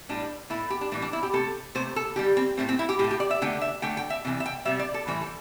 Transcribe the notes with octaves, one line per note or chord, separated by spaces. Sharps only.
A2 G3 D4
A2 A3 E4
G4
D4
A2 E3 G3 A3
D4
E4
G4
C3 A3 A4
C3 A3 C5
A4
D3 G3 G4
C4
A2 A3 C4
C4
E4
G4
A2 G4
A3
G4
D5
E5
D3 A3 G5
E5
D3 A3 G5
G5
E5
C3 E3 G3
E5
G5
C3 G3 E5
D5
A4
A2 E3 G3 C5
A4